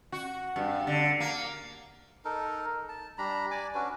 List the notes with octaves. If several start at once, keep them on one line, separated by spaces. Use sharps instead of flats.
F#4
G2
D3
A#3
D#4 A4 A#4
A5
G3 D4 A#5 B5
D5 G#5 D6
C#4 D4 F#4 B4